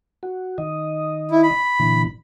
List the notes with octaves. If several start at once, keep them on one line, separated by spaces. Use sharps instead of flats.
F#4
D#3 D#5
E4
B5
A#2 D3 E3